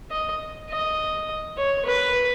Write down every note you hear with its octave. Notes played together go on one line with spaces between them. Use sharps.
D#5
D#5
C#5
B4